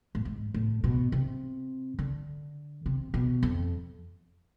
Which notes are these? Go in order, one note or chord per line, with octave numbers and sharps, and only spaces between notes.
A2
G#2
A2
B2
C3
D3
C3
B2
F2